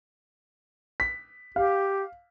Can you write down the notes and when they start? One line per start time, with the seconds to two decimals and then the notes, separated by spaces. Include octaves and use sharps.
1.00 B6
1.56 G4 F5